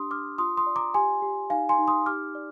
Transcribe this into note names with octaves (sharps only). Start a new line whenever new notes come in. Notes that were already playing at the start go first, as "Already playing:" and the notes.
Already playing: D4 G4 C6 D#6
D4 D6 F6
F4 C6 D#6
C6 D#6
D5
A#5 D6
G4 G#5 C6
G4
D#4 F5 G#5
G#5 C6
D#4
C6 D#6
G4 D6 F6
D5